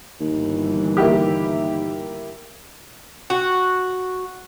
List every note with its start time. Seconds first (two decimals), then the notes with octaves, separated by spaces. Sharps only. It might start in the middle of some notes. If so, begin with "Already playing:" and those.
0.20 G1 D#2 E3
0.97 A#3 E4 G4
3.30 F#4